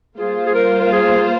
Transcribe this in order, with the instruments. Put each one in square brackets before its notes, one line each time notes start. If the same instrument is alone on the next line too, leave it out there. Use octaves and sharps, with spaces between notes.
[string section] G3 A#3 F4 C5 [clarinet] G#4
[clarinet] G#4
A#4
A#4
G#4